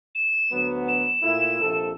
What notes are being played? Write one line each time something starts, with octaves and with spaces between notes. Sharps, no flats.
E7
D2 F#3 B3
E7
A#2 A3 E4
A#1 C3 A4